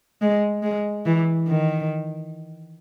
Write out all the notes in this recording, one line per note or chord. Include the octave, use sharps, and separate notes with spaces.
G#3
G#3
E3
D#3